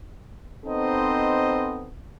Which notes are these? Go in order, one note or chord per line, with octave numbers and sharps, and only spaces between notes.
B3 C4 D#4 A4 C5 D#5